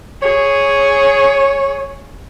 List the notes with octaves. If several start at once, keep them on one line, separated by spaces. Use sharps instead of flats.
G#4 C#5